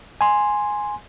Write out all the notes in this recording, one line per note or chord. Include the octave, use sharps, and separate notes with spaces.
G#5 C6